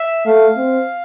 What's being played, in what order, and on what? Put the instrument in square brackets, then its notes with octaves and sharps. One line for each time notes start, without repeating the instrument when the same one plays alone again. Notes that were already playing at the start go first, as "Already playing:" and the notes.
Already playing: [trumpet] E5
[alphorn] A3 [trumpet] F5
[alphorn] C4